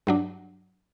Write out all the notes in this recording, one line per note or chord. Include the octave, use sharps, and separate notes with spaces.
G2 F#3 D4